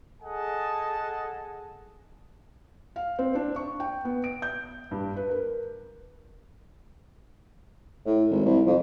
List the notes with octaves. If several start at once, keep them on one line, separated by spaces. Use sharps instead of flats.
G#4 A4 D#5 F#5 G#5 A5
F5
C4
D4
C#6
G5
B3
D7
G6
G2
B4
A#4
A2
G#1
C2
F2